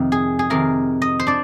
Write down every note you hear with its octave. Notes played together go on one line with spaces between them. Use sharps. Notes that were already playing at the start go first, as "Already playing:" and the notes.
Already playing: F2 C3 D#3
G#4
G#4
F2 C3 D#3 A#4
D#5
C5
D4 D5